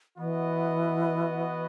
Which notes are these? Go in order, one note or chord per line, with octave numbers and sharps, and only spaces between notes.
E3 B3 F#4 B4 D#5